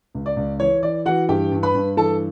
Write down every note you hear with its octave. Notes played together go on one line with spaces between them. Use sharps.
C#2
D5
C#2
E3 C#5
E3 D5
E3 F#4 F#5
G2 G4 G5
G2
B4 B5
G2
E3 A4 A5